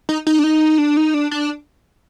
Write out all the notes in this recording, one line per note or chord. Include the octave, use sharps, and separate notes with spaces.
D#4
D#4
D4
D#4
D4
D#4
D4
D4